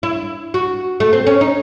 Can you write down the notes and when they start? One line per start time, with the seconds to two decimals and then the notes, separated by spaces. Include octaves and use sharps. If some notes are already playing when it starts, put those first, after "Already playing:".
0.03 E4
0.54 F#4
1.00 A3
1.13 C4
1.27 C#4
1.41 D#4